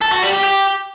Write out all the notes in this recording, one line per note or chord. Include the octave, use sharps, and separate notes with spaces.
A4
F#4
G3
G4
G4